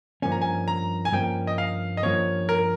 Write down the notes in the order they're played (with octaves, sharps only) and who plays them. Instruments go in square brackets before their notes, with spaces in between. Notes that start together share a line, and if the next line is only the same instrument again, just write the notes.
[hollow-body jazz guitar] G2 F3 A#3 C#4 [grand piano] G#5
[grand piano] A#5
G#5
A#5
G#5
[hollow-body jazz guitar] G2 F3 A#3 C#4 [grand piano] G5
[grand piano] D#5
F5
D#5
[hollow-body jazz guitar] G2 F3 A#3 C#4 [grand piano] C#5
[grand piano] A#4